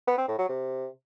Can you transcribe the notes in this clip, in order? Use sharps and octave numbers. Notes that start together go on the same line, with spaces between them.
B3
C4
A2
F#3
C3